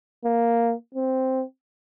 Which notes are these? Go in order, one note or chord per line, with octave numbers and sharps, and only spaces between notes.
A#3
C4